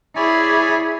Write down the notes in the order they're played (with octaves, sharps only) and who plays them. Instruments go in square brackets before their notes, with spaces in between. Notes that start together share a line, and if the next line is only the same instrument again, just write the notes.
[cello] E4 G#4 [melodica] C#5 D5 G#5